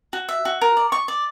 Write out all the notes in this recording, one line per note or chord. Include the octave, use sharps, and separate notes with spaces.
F#4
E5
F#4
A#4
D5
C#6
D5